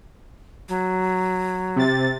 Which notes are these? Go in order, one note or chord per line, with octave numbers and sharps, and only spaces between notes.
F#3
C3 A6